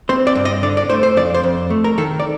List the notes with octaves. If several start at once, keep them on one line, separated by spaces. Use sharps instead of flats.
C4 C5
D5
G2
D#5
D3 D5
D5
A3 C5
C5
F2 D5
C5
F2
A3
A#4
D#3 A4
D5